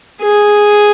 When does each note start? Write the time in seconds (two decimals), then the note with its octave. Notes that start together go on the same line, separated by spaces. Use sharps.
0.21 G#4